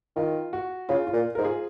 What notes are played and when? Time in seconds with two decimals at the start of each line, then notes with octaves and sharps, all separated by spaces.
0.16 D#3 F4
0.53 F#4
0.89 C#3 F4
1.07 F4
1.13 A#2
1.35 G#2 A#4
1.43 F4 G#4